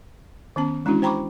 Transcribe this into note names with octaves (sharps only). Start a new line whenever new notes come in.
D#3 B3 C#4 A5
E3 G#3 C#4 D4 E4 F#4
C5 G5 A#5 B5 C#6 D6